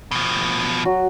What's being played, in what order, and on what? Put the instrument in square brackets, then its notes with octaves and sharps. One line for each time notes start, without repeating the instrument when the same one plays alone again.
[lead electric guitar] B2 F3
[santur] F#3 F#4